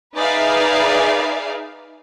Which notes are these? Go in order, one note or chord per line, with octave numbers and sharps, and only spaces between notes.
D#4 G#4 B4 D5 E5 F5